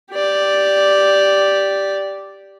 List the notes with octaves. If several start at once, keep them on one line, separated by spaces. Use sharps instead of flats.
G4 D5